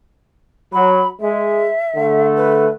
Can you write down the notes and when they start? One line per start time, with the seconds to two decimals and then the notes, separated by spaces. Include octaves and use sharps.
0.73 F#3 B5
1.20 G#3 E5
1.95 D3 A3
2.36 B4